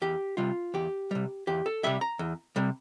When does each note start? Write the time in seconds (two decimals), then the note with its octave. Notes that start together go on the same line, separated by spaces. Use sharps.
0.02 E2 G4
0.37 C3 G3 F4
0.74 E2 G4
1.11 C3 G3
1.47 E2 G4
1.66 A4
1.83 C3 G3 E5
2.01 A#5
2.19 E2
2.56 C3 G3